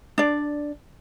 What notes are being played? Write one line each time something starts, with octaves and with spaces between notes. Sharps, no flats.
D4 D5